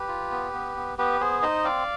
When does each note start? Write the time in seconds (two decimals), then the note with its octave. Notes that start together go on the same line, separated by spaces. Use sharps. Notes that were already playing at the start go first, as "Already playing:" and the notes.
Already playing: G4 B4
0.08 F4
0.31 B3
0.53 B3
0.76 B3
0.98 B3 G4 B4
1.21 B3 G#4 C5
1.42 D#4 C5 D#5
1.65 C4 D5 F5